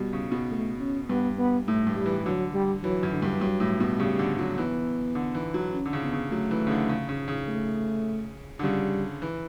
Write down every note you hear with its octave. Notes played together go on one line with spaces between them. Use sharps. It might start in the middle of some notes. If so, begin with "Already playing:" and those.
Already playing: B2 G3
C#3
B2
A3
C#4
G2 B3
B3
A2 A3
G2
G3
E3
D3 F#3
G3
E3 F#3
F#2
D3
G2
G2 F#3
A2
B2
C#3 G3
D3
F#3
E3 B3
D3
E3
F#3
C#4
D3
C#3
B3
C#3
F#3 A3
E3
C#3
D3
C#3
C#3
C#3
A3
D3
C#3 G3
E3